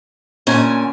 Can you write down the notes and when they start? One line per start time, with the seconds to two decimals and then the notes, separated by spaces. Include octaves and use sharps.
0.47 A#2 D3 C#4 G#5